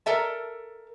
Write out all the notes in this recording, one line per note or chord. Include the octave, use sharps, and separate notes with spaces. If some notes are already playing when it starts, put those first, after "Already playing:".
A4 A#4 E5 A5